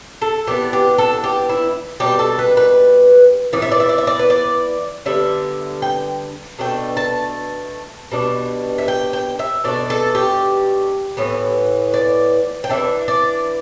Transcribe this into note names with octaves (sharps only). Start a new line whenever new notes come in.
A4
E3 B3 D4 G4
G4
A4
G4
E4
B2 G3 D4 G4
A4
B4
B4
E3 B3 D4 D5
E5
D5
E5
D5
E5
D5
B4
D5
D3 G3 B3 E5
G5
B2 A3 D4 G5
A5
B2 G3 D4
E5
G5
G5
E5
B2 A3 D4 D5
A4
G4
A2 E3 B3
D5
G5
E3 B3 D4 E5
D5